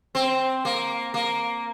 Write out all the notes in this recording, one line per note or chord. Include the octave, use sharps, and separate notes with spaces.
C4
A#3
A#3